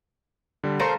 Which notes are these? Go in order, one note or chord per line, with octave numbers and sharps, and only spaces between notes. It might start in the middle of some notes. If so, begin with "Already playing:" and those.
D3 G3
A3 A#4 C5 F5 A#5 C6